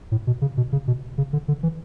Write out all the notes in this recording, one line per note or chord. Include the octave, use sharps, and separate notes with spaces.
A2
B2
C#3
B2
C#3
B2
C#3
D3
D3
E3